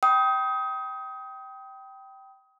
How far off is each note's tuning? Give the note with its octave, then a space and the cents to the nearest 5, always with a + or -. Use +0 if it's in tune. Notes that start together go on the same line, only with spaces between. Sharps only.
G5 -15 B5 +0 D#6 +25